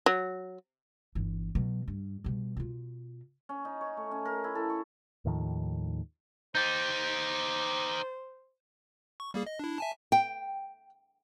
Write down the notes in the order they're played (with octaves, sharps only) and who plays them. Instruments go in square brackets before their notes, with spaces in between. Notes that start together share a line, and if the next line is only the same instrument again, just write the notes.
[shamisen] F#3
[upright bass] G1 E3
B2 F#3
G2
B2 G3
B2 F4
[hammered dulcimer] C#4
D#4
C#5
A3
C#4
A#4
E4
A4
C#6
[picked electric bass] D#2 A2 D#3 F3
[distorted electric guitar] D#4 G4 [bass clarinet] C5 [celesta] G6 A6
[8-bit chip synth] C#6
G3 A#3 G#4
D#5
D4 E4
E5 G#5 A5
[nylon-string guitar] G5